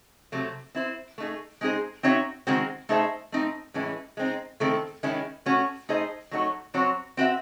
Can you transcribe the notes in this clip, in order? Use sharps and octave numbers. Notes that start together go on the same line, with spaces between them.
C3 F#3 A3
C4 E4 C5
A3 D#4 G#4
G#3 C4 D#4 G#4 C5
C4 D#4 F#4 C#5 E5
D#3 G#3 C4 F#4
A3 D#4 G#4 C5 E5
A3 C4 D#4
A2 E3 G#3 C#4 E4
G#3 C4 D#4
D#3 A3 C4 E4 A4
D#3 G#3 C#4 E4
A3 C#4 F#4
A3 D#4 G#4 C5 D#5
F#3 A3 D#4 F#4 C#5
F#3 C4 F#4 C#5
C4 F#4 C5 E5